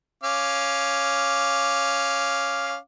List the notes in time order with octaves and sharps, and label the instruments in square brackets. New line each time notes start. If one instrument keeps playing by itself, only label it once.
[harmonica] C#4 F5 D6